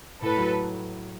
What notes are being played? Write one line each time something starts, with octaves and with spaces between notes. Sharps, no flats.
A2 A4 B4
F#3